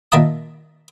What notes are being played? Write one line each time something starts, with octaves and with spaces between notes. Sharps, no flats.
A#2 D#3 E5 A5 D#6